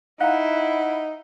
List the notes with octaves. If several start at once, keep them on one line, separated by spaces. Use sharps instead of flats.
D#4 E4 F5 F#5 A#5